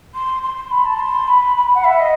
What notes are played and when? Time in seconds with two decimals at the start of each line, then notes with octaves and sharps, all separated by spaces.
0.14 C6
0.42 C6
0.56 C6
0.71 B5
0.85 A5
0.99 C6
1.27 B5
1.56 B5
1.74 F#5
1.84 E5
1.99 D#5